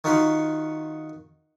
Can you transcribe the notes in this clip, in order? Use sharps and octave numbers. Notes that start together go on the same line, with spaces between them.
D#3 D#4 F4 F#4 B5 C6